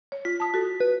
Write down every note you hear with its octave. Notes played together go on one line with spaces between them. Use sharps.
C#5
F4 B6
A5 D#6
F#4 A4
B4